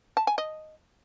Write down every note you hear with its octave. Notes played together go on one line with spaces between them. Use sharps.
A5
G#5
D#5